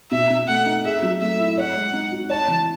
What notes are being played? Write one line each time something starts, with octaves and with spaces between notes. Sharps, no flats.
B2 E5
B2
A3 F#5
D#4
G#4 E5
F#3
A3 E5
E4
C#5 F#5
G#3
D#4
F#4
C#5 A5
E3